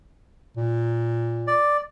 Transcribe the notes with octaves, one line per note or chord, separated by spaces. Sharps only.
A#2
D5